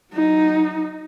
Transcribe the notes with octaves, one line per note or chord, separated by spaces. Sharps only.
F#3 D#4